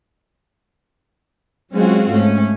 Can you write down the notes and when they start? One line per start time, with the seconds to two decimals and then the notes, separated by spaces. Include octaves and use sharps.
1.74 F#3 G#3 C4 C#4 F4 F#4
2.11 G#2 A3 C#4